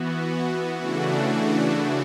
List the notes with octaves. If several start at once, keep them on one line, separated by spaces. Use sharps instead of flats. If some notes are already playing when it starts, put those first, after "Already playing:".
Already playing: E3 B3 F#4
C#3 E3 A3 D4 F#4